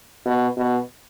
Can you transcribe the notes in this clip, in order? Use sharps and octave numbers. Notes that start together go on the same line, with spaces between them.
B2
B2